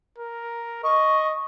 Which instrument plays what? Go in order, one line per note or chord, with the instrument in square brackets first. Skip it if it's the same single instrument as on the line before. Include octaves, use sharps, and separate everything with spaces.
[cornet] A#4
[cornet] D#5 [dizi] C#6